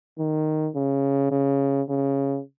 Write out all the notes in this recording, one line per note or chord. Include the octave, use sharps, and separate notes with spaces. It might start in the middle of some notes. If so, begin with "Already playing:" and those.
D#3
C#3
C#3
C#3